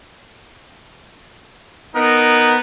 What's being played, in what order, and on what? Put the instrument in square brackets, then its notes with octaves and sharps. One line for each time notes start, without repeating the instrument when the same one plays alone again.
[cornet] B3 [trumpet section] D#4 A#4